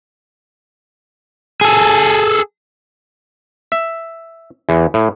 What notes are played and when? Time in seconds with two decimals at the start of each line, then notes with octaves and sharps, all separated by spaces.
1.61 G#4 A4
3.72 E5
4.69 E2
4.94 A2